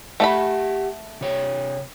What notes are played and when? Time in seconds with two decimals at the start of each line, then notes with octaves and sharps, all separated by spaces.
0.20 A3 G4 D5 F#5 B5
1.21 C3 C#5 G5